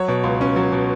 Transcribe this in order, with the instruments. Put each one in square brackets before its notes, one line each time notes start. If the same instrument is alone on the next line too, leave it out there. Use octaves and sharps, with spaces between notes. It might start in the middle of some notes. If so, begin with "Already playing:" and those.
Already playing: [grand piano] F#3 C#5
B2
C#2
C#4
F#3
B2